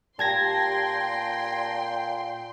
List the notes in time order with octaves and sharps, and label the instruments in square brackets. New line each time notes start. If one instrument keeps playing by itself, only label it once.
[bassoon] A#2 [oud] G4 [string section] G5 C6 [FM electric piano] A5 G#6 A#6